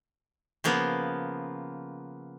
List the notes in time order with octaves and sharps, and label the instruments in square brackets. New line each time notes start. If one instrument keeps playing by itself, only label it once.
[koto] C#3 F3 A#3 B3